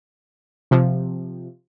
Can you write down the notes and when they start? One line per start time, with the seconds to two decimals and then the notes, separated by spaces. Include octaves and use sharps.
0.71 C3 F3